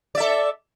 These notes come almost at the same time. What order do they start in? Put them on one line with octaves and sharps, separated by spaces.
D5 E5 A4